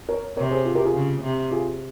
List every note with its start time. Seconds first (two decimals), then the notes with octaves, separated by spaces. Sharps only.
0.09 A#4 C#5
0.37 C3 A#4 C#5
0.50 G#4 C5
0.65 F4 G#4
0.75 G4 A#4
0.85 F4 G#4
0.94 C#3
1.23 C3
1.51 F4 G#4